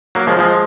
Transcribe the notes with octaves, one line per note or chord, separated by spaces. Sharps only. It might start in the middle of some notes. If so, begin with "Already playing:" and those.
F#3 A#3
F3 G#3
F3 G#3